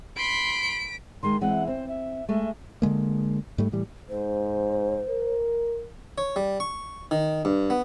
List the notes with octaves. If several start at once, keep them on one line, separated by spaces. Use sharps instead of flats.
B5 C6 B6 D7
D#3 G#3 C6
E3 G#3 C4 F#5
C4 C5
E5
G#3 A3 E5
D3 D#3 G#3 A#3
G#2 G3 A3
A2 E3 G3
G#2 C5
A#4
C#5
G3
C#6
D#3
G2
B3